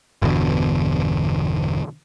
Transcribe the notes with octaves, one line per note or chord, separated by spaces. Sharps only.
G1 E2 B2 D3